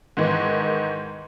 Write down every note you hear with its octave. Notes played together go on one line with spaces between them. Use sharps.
G#2 D#3 E3